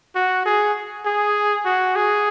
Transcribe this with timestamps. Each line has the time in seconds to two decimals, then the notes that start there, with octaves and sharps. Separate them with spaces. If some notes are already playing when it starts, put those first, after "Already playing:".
0.15 F#4
0.46 G#4
1.05 G#4
1.66 F#4
1.96 G#4